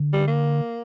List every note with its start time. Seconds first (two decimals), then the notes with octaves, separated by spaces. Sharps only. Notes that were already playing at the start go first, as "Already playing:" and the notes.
Already playing: D3
0.13 G3
0.28 A#3